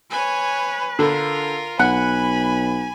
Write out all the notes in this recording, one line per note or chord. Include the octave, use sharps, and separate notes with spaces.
B4 C#5 G#5
D3 F4 A#4
B1 F#5 G#5 B5